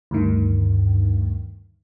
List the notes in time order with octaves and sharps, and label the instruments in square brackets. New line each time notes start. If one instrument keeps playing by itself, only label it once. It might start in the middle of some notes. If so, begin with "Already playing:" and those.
[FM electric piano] D2 G2 D#3